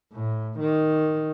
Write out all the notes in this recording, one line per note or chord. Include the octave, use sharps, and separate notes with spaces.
A2
D#3